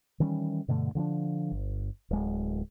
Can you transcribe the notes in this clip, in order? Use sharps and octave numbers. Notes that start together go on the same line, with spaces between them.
D#3 E3 G3 C#4
G2 B2 D3 A3
D3 F3 C#4 D4
G1
D1 G#3